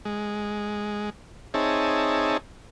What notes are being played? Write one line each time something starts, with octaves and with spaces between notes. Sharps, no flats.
G#3
C4 D#4 G#4 C#5 E5 A5